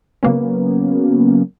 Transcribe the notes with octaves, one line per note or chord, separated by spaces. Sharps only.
C#3 F#3 A#3 B3 C#4